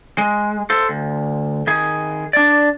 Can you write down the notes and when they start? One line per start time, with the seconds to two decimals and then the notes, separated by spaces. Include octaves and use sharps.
0.18 G#3
0.70 A4 C5
0.89 D2
1.67 D#3 G#4
2.33 D4 D5